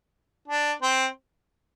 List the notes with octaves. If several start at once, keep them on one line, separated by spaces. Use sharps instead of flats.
D4
C4